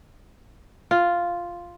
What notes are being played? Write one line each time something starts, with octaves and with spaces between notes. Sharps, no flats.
F4